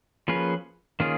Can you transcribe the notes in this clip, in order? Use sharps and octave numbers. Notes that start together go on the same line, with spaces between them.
F3 A#3 C#4 G#4 B4
D#3 A#3 C#4 F4 G#4